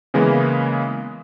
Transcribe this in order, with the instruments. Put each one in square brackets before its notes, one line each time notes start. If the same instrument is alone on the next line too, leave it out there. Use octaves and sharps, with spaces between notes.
[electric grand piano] C#3 E3 G#3 A#3 B3